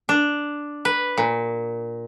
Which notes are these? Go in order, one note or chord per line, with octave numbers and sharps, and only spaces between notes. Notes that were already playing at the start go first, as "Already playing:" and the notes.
D4
B4
A#2